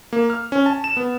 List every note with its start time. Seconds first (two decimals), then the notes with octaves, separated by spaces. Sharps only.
0.13 A#3
0.30 F6
0.52 C#4
0.66 A5
0.84 E7
0.97 B3